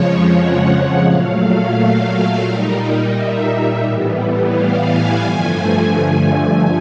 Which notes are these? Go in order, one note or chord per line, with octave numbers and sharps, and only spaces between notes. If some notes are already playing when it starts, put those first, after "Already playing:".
Already playing: F2 C#3 F3 G#3 C#5
F#5
A#2 F#3 A3 F5
A#2 G3 A#3 D#4
E5
A2 E3 G3 B3
F5
G#5
G2 D3 F3 A3